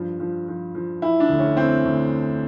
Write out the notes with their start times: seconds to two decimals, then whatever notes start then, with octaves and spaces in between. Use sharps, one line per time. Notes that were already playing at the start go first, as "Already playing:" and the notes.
Already playing: G2 F3
0.20 F3
0.48 F3
0.75 F3
1.02 E3 E4
1.20 D4
1.29 D2
1.39 C#4
1.57 E3 C4
1.85 D2